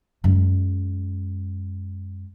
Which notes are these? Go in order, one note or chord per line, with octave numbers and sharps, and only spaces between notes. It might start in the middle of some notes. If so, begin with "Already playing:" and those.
F#2 G#3